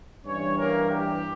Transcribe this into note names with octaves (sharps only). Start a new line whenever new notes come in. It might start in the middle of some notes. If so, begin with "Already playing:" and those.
G2 E3 G3 C#4 C#5
A#3 A#4
G4